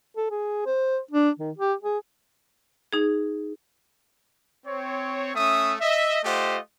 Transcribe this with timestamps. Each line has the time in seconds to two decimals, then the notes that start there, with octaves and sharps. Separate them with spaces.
0.16 A4
0.31 G#4
0.66 C5
1.11 D4
1.39 D#3
1.57 G4
1.83 G#4
2.93 D#4 G#4
4.66 C4 C#5
5.34 A3 C#4 E5 D#6
5.81 D#5 E5
6.23 A3 F4 G4 C5 D#5 F#5